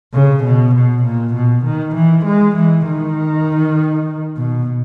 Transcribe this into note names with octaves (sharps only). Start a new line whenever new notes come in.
C#3
B2
B2
A#2
B2
D#3
E3
G#3
E3
D#3
B2